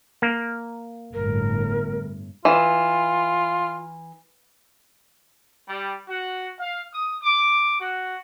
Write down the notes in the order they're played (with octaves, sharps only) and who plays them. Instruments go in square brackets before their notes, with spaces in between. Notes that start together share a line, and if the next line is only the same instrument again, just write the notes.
[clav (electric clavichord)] A#3
[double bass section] G1 A2 [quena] A#4
[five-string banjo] E3 [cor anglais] F4
[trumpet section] G3
F#4
F5
D#6
D6
F#4